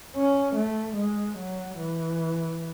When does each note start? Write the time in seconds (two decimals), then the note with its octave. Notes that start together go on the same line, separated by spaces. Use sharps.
0.16 C#4
0.56 A3
0.96 G#3
1.38 F#3
1.79 E3